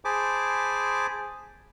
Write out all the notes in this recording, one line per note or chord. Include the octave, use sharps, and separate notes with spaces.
G#4 C5 G#5 A5 B5 D6